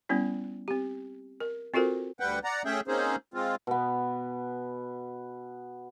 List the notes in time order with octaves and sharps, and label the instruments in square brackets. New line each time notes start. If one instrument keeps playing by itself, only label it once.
[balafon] G3 B3 C#4 E4
C4 G4
A#4
C4 F4 F#4 A4 A#4 C5
[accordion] D2 G3 B4 F#5 G5
D5 F#5 A#5
A3 C#4 G#4 E5 G5
A#3 C4 C#4 D#4 G#4 C5
G#3 C4 F4
[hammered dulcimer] B2 B3